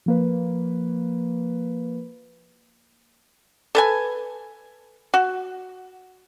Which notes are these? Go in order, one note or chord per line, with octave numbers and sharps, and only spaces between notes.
F3 A#3 B4
A4 B4 G#5
F#4